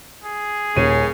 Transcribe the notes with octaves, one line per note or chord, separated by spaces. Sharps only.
G#4
D#1 C#3 C#4 D#7